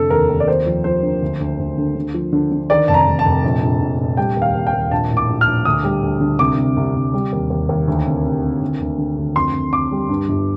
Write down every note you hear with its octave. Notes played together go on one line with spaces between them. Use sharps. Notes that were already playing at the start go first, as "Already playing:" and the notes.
Already playing: F1 D3 A4
D#2 A#4
D#2
D5
D#2 C5
F3
F3 C5
D3
D2
D2
D2
D3
D3
F3
D3
D3
D#3 D5
F1 A5
A#5
F1
A5
F1
A#1
A#1
A#1
A#1
G3 G5
D#2
F5
D#2
G5
D#2
A#1 A5
A2
D6
A#1
F6
A#1
D2 D#6
G3
D2
D3
C2 D6
C3
C2
C2
G3
D#2
D#2
D#2
D2
C3
C3
C3
D2
D2
D3
D2
F2 C6
F2
F2 D6
G3
G2
G1